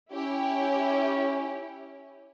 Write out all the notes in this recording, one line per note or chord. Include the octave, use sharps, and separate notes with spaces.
C#4 E4 G4 C#5